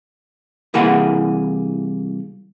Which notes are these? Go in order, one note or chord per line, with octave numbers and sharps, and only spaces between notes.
C2 E3 A#3 G#4 F#5